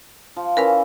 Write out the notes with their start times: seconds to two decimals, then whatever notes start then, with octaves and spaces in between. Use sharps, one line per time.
0.36 F3
0.57 E3 C#4 A#4 B4 F5